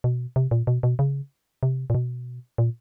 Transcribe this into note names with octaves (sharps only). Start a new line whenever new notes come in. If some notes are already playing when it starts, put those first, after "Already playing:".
B2
C3
A#2
B2
B2
C#3
C3
A#2
B2
A#2